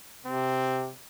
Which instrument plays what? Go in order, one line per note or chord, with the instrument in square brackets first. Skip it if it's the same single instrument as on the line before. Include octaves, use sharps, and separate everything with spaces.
[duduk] C3 [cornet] C4